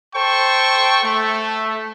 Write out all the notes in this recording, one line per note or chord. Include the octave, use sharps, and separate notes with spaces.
A4 C5 G5 C#6
A3